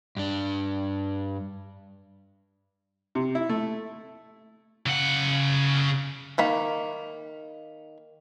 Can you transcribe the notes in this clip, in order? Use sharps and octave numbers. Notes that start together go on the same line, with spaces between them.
G2 D4
C3
E4
A3
C#3 F#5
D#3 A#3 B5